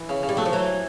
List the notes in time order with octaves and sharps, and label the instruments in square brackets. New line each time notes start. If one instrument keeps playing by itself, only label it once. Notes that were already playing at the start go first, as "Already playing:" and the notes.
Already playing: [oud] E3
[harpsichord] C#3
C#3
[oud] G3
[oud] F#3 [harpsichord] A3
[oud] F3
[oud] E3 [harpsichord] F#3